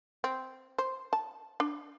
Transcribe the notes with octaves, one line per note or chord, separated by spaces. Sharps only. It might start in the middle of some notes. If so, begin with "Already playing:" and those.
C4
C5
A5
D4